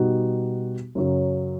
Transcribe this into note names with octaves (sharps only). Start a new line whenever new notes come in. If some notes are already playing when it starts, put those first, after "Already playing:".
Already playing: B2 G3 B3 D#4 F#4
F#2 C#3 F#3